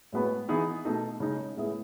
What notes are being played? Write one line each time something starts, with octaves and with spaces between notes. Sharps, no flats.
A2 G#3 B3 F#4 B4
E3 B3 D#4 G#4
B2 A3 D#4 A4
C#3 G#3 D#4
A2 G#3 B3 E4 G#4